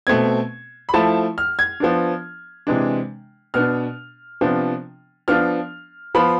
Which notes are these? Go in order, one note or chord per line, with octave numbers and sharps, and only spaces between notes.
B2 A3 C4 G#6
B5
F3 A3 E4 A5
F6
G#6
F3 B3 D4
C3 E3 G#3 D4
B2 B3 D4 F6
C3 F3 B3 D4
F3 B3 D4 F4 F6
F3 B3 F4 B5